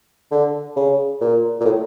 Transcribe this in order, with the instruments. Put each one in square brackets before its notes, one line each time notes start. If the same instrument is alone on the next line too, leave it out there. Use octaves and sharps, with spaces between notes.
[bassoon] D3
C#3
A#2
A#2
A2